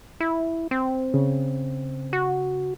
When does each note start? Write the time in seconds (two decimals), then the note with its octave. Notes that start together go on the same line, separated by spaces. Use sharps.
0.20 E4
0.71 C4
1.14 C#3
2.13 F#4